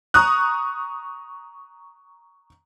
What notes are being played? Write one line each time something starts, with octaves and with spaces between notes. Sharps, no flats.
A#5 C#6 D#6 F#6